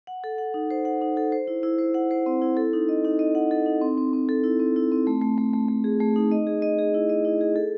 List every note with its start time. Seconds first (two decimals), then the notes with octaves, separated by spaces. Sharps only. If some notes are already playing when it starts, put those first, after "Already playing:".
0.07 F#5
0.24 A4
0.38 F#5
0.54 D#4
0.71 C5
0.85 F#5
1.01 D#4
1.17 A4
1.32 C5
1.48 E4
1.63 E4
1.79 C5
1.94 F#5
2.11 C5
2.26 C4
2.42 E4
2.57 A4
2.73 D#4
2.89 D#5
3.05 D#4
3.19 D#5
3.35 F#5
3.51 A4
3.66 D#4
3.81 C4
3.97 C4
4.13 C4
4.29 A4
4.44 E4
4.60 C4
4.76 E4
4.92 C4
5.07 A3
5.22 A3
5.38 A3
5.53 A3
5.68 A3
5.84 G#4
6.00 A3
6.16 D#4
6.31 D#5
6.47 G#4
6.62 D#5
6.79 G#4
6.94 E4
7.09 D#5
7.25 E4
7.41 G#4
7.56 A4